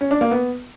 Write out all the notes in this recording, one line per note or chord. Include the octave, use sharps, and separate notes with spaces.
C#4
D4
A#3
B3